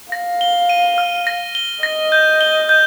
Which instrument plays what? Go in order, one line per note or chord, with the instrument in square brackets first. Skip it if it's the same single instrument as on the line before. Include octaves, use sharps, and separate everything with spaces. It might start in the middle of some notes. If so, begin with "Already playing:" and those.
[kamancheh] F5 [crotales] A#6
[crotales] G7
D#7
F6
A#6
G7
[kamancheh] D#5 [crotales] A#6
[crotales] G6
G7
G6